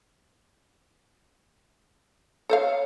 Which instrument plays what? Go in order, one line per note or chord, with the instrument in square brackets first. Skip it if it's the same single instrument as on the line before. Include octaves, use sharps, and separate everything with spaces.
[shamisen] A4 C5 F5 [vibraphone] C#5